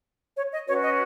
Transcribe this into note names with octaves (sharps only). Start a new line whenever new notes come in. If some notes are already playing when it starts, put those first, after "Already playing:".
C#5
D#5
C#4 F#4 B4 C#5
D#5